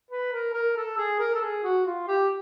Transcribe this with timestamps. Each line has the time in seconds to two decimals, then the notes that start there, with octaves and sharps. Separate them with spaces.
0.11 B4
0.33 A#4
0.54 A#4
0.77 A4
0.97 G#4
1.20 A#4
1.35 A4
1.42 G#4
1.64 F#4
1.85 F4
2.08 G4